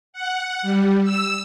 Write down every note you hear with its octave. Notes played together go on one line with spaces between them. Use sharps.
F#5
G3
E6